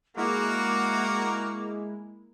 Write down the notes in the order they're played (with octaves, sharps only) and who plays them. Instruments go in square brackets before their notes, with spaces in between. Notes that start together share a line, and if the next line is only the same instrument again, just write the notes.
[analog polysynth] G#3 E4 [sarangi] A#3 [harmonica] F#4 A#4 F#5 [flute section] D6